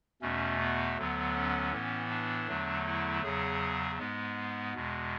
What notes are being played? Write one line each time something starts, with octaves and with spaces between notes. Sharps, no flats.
E2 B2 A3 C#4
B3
D2 D3 F#3 B3
C#4
A2 E3 B3
D4
E2 D3 F#3 A3
E4
E2 C#3 F#3 G#4
G#2 G#3 B3
E2 B2 G#3